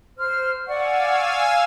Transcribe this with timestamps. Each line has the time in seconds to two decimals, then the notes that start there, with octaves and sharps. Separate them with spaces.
0.18 C5 F6
0.67 D5 F5 F#5 G#5 C#6 E6